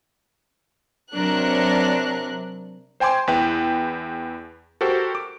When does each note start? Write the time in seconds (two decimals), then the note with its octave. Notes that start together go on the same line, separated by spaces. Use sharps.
1.13 C3 F#3 D4 A#4 F#6
3.00 C5 G5 G#5 C6 D6
3.27 E2 E4 B4 G5
4.81 F#4 G4 A4 A#4 C5
5.15 D6